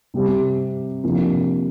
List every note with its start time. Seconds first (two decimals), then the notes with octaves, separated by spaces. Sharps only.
0.14 C3 G3 C4 G4
1.03 F2 C3 F3 A#3 D4